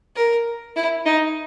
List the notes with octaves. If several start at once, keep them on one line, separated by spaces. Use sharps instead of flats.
A#4
E4
D#4